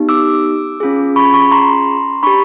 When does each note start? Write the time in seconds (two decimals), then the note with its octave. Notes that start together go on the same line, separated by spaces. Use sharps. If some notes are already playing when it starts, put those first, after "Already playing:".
Already playing: B3 D#4 G4
0.09 D6 E6
0.80 C#4 F4 G#4
1.16 B5 C#6
1.34 B5 C#6
1.52 A#5 C6
2.23 D4 G4 B5 C#6